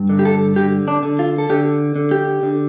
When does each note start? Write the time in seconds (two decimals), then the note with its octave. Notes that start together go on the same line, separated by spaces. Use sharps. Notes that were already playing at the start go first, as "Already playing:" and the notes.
Already playing: G2
0.09 D3
0.19 G4
0.25 A4
0.56 D3 G4
0.88 D4
1.03 D3
1.19 F4
1.38 A4
1.50 D3 G4
1.96 D3
2.11 G4
2.43 D3